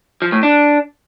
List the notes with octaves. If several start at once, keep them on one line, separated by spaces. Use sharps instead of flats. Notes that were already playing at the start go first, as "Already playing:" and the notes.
F3
A2
D4